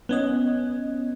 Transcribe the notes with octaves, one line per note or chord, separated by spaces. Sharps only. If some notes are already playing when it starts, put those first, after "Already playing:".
B3 C#4 D#5